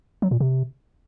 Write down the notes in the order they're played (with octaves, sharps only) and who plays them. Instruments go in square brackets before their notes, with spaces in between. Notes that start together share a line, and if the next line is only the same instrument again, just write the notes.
[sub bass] F#3
A#2
C3